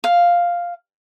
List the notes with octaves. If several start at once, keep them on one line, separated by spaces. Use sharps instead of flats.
F5